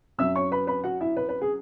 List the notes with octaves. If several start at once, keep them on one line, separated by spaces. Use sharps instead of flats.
F#2 F#3 E5 E6
C#5 C#6
B4 B5
B4 B5
F#4 F#5
E4 E5
B4
B4
G#4